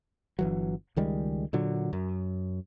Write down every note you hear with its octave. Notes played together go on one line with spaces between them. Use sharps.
G1 E3 F#3
C#2 D#3 G3 G#3
A#2 D3 F#3
F#2